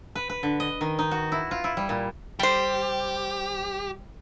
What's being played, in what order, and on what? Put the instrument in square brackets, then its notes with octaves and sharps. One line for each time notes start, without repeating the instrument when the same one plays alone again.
[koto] B4
B4
D3
D#5
D#3
D#4
F#4
E4
F4
E4
G3
A#2
[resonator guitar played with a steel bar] G3 C5 [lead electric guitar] G4